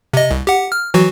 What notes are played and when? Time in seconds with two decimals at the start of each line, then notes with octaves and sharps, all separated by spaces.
0.13 C3 D#5
0.31 C2
0.47 G4 F#5
0.72 F6
0.94 E3 F#3 F#4